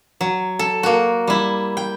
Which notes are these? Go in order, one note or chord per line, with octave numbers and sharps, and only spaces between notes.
F#3
A4
A#3 F#4
G3 E4
G5